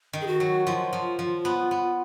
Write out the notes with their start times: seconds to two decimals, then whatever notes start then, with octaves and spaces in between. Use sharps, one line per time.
0.13 D#3
0.21 G#4
0.27 F#4
0.40 F#3
0.67 F3 F4
0.93 F3
1.19 F3
1.45 B3
1.71 B3